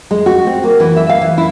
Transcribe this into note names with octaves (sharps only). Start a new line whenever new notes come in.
G#3
F#4
C4
A#3
E3
E5
F5
E3
E4